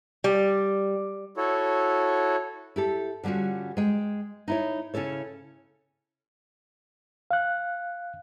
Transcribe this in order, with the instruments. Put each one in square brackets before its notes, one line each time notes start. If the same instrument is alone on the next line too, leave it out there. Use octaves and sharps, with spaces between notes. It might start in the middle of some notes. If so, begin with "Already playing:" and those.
[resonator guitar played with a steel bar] G3
[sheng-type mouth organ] E4 F#4 A4 C#5
[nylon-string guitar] E4 G4 A4
D3 G3 C#4 F4 F#4
G#3 G5
D#4 E4 C#5
C#3 C#4 E4 A4 C#5
[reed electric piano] F5 F#6